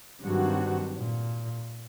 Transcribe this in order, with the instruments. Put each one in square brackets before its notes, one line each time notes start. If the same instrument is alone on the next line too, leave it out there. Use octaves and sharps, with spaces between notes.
[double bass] G2 [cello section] D#3 F#3 C4 F#4
[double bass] A#2